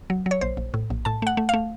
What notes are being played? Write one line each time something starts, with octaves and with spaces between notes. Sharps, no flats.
F#3
F#3
C#5
A#1 C5
A#1
A2
A#1
A2 A5
A3 F#5
A3
A3 F5